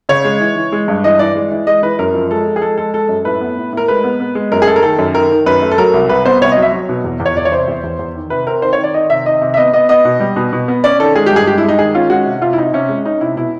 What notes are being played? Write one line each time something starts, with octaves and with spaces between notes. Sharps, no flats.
C#3 C#5
G#3
E3
E3
G#3
G2
E3 D#5
E3 D5
G#3
E3
G#3 D#5
E3 B4
F#2 A#4
F3
G#3 A4
F3
G#4
G#3 A4
G#3 A4
G#3 A4
F#2
A2 B4
B3
A2
A2 A#4
G#3 B4
B3
B3
G#3
F#2 A#4
G#4
A3 A4
A#4
D#3 A4
F#2
D#3 A#4
D#3
F#2 B4
A3
A4
F#3 A#4
C2
C2 B4
B3 C5
C2 C#5
D#5
F#3
E5
F#3
B2
E2
E2
C#5
E2 D5
C#5
C3 C5
E2
E2
E2
D#3
C3 B4
C4 A#4
D#3 C5
C#5
D#3 D5
D#3 D#5
C3 E5
D#3 D#5
C3
E5
B3 D#5
B3 D#5
B3 D#5
B2
G3
B2
B2
B3
C#4 D5
D#3 A4
G#3 G#4
G4
G2 G#4
G#3 G4
E4
G#3
D#4
D#3 G#4
C#4 F4
G#3 F#4
C3
C3 F4
E4
C3 D#4
C3 C#4
G#3
C#4 D#4
C3 E4
B2 E4